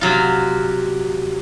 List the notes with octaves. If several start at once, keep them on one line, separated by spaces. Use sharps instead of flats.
C3 F#3 F4